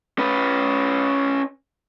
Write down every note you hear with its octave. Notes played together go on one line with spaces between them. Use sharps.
C#4 B4